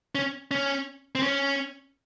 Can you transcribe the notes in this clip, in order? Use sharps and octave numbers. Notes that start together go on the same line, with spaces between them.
C#4
C#4
C4
C#4